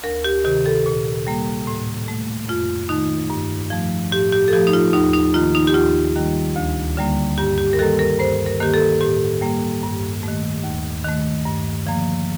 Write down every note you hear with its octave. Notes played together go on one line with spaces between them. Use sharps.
D2 A#4
G4
C3 D#3 G4
A4
A#2
G3 A#3
A2
A3
F2 F4
D#3 A3 D#4
G2
F3 A3
A2 G4
G4
A4
F3 A3 G4
D#4
F4
D#2 D#4
D#4
D#3 A#3 F4
D#4
G4
D#2 F4
D#3 G3 A#3
D2
D3 G3 A#3
G2 G4
G4
A#4
D#3 G3 A#3 A4
A#4
G2 C5
A#4
D#3 A#3 G4
A4
A2 G4
G3 A#3
G2
D#3 A3
D#2
D#3 A3
G2
D3 F3 A#3